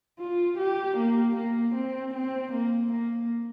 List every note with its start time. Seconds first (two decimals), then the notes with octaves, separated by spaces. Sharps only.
0.19 F4
0.58 G4
0.97 A#3
1.36 A#3
1.75 C4
2.14 C4
2.52 A#3
2.92 A#3